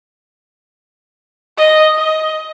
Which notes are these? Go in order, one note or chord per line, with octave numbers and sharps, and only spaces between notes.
D#5
D#5